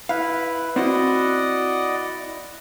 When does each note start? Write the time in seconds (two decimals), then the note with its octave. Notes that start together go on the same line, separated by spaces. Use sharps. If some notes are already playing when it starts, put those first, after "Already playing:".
0.09 E4 B4 F5
0.76 C4 E4 F#4 D5 D#5 F#5